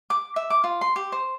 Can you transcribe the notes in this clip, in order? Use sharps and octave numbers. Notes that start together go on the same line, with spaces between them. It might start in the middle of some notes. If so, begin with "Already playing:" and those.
D6
E5
D6
F4
C6
G4
C5